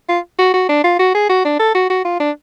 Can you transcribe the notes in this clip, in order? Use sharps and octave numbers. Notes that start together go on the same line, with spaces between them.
F4
F#4
F#4
D4
F4
F#4
G#4
F#4
D4
A4
F#4
F#4
F4
D4